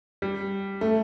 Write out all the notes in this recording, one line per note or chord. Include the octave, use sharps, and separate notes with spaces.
G3
A3